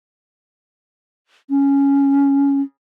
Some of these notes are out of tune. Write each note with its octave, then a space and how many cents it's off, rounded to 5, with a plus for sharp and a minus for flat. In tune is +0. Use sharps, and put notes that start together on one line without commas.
C#4 +5